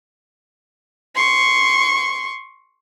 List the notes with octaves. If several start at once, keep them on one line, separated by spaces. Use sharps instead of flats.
C6 C#6